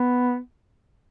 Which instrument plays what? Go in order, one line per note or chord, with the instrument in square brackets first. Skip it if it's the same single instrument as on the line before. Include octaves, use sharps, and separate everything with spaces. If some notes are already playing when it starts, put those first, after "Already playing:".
Already playing: [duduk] B3